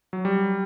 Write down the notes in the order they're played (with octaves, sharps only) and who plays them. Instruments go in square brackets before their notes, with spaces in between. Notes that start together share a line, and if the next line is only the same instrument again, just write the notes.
[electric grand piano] F#3
G3